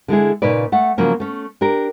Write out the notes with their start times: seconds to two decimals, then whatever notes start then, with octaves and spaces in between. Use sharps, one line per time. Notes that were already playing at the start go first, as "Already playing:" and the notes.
0.08 D3 G#3 E4 G#4
0.42 A#2 C#3 D#4 B4 D5
0.72 A3 F#5
0.98 C#3 F3 F#3 A#3 C#4
1.20 A3 C#4
1.61 D4 G4 A#4